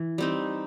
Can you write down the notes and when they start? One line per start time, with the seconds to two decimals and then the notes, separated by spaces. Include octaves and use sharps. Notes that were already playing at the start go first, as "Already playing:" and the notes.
Already playing: E3
0.18 G3 C4 D#4